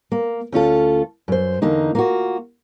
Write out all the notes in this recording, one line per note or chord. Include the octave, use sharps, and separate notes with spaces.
A#3
D2 C#4 F4 A4
F#2 C5
E2 D3 A#3 D#4
A#3 F4 F#4